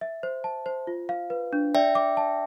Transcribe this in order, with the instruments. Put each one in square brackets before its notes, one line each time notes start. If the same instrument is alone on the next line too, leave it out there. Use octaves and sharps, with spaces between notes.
[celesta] E5
C5
A5
C5
F4
F5
B4
D4
[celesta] D5 [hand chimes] E5 G5
[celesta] D6
A5